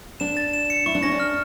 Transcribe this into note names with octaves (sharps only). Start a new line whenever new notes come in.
D4 E7
A6
E7
C#7
E4 C#6
D4
C#4 A#6
D4
F6